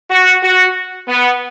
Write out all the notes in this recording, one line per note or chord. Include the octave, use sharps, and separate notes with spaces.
F#4
F#4
B3